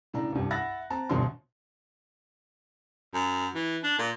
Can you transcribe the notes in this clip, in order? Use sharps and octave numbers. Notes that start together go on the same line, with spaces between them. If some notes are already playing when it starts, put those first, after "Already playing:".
A2 C#3 D4 A#5
C2 G2
E5 F#5 B5 F#6 A6 A#6
C4 A5 A#5
G1 D2 G2 B2 C6
F#2
E3
D4
A#2